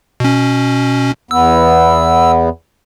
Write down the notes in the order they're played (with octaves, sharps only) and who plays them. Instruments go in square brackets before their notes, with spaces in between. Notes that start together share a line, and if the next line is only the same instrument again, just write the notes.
[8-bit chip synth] B2 C#4
[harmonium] E2 B3 [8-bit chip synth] E6